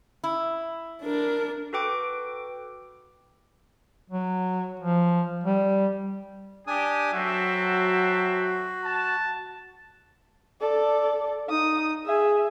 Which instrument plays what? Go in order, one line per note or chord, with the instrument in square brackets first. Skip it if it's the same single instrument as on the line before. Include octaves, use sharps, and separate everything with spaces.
[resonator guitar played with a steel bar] E4
[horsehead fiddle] D4 A#4
[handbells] F#4 A4 B4 G5 D6 D7
[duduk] F#3
F3
G3
[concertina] D4 G#5 D#6 [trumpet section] G4
[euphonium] F#3 [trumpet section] C4 A4 E5 [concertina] F#4
[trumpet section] A5
[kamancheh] A4 D5
[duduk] D#4 [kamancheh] D#6
[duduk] G#4 [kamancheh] E5